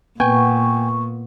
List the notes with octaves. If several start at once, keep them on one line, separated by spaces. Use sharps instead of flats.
A#2 B3 G5 G#5 C#6